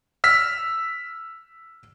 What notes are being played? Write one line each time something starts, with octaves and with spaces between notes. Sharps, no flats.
E6 F6 B6